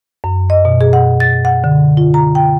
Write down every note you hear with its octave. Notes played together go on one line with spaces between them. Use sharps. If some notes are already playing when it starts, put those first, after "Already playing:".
F#2
D#5
B2
G#4
F#5
A6
F#5
D3
F4
A#5
G5